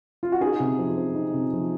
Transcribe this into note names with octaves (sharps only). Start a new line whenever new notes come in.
F4
F#4
D#4 G#4
C3
F3
C4
D#4
C3
F3